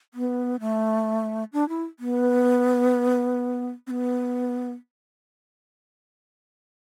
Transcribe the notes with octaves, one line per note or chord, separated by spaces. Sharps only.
B3
A3
D4
E4
B3
C4
B3